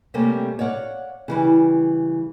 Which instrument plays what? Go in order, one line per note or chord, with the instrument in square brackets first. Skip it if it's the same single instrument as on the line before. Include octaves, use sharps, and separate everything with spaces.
[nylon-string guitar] C3 G3 A3 A#3 C4 C#4
C#5 D5 F5 F#5
C#3 E3 G3